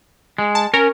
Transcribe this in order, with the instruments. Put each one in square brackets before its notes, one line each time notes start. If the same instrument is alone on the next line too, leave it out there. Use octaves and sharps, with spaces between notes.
[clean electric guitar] G#3
[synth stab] A5
[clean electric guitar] C#4 [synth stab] A#4